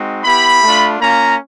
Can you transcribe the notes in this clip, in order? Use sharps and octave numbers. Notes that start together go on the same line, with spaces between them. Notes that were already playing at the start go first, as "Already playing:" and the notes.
Already playing: G#3 C4 D#4 F#4
B3 E4 G4 B5
A3 D4 F4
A#3 C#4 F4 A#5